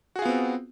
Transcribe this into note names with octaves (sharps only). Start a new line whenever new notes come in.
B3 C4 F4 F#4 G#4